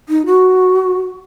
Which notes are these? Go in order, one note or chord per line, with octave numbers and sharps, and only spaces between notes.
D#4
F#4